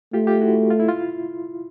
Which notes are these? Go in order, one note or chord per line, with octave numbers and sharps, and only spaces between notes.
A3 F4 G4
F4 G4
E4 F#4
F4
E4
F4